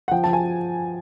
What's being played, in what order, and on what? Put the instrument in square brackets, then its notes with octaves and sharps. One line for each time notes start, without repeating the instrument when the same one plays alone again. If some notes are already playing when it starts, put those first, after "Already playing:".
[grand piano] F#5
F3 G5
F3 A5
G#5